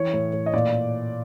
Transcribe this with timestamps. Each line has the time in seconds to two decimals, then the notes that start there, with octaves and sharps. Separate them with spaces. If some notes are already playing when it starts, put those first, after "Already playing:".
Already playing: E3 C#5
0.13 A2
0.33 A2
0.46 D#5
0.53 A#2 D5